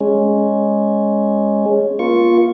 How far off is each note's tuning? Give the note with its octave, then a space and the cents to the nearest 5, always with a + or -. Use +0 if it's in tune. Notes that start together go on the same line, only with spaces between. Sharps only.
G#3 +0 C#4 +0
A#3 +30 F4 +0 C#6 +0